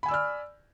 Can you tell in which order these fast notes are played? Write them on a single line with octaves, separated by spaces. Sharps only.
B5 G#5 E6 D5 F6